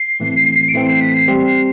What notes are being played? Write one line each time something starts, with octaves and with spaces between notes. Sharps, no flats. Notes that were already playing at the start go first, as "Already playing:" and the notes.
Already playing: C7
A2 E3 A3 C4
D7
A2 E3 A3 C4 C7
C7
B6
C7
G3 C4 G4 C5
C7